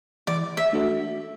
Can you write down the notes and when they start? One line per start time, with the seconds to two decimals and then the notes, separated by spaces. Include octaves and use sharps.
0.27 E3 D5
0.57 E5
0.73 A3 D4 F#4 A4